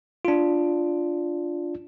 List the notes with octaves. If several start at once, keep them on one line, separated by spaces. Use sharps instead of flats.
D4 F4